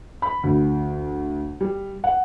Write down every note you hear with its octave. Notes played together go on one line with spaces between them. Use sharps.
B5
D2
G3
F#5